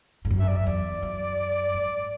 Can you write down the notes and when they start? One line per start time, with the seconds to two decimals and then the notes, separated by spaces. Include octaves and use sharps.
0.25 G#2
0.30 F#2
0.39 E5
0.48 D5
0.57 E5
0.66 E2 D5
1.02 F#2
1.74 G#2